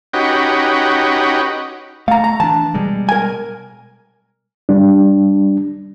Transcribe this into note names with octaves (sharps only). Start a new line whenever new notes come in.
C#4 D#4 F#4 G4 B4
A3 F5 A#5
A#5
E3 D4 A5
B2 G3 G#3
A#4 G#5
G3 D4